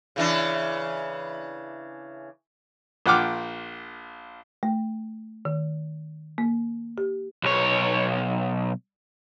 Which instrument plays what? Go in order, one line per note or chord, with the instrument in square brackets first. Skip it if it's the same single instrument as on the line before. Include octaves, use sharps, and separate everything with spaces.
[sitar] C#3 E3 D4
[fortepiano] A#1 F4 F#5 G5 D6 F6
[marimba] A3
D#3
A#3
G4
[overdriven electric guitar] B1 C#5